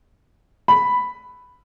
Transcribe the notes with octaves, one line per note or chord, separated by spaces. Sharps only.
B5